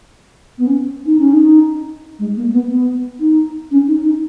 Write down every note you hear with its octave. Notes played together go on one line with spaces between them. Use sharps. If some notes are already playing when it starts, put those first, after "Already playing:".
B3
C#4
D#4
C#4
D#4
G#3
A#3
B3
B3
D#4
C#4
D#4
D#4